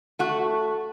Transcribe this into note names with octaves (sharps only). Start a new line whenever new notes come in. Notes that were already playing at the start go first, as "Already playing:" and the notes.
A3 F#4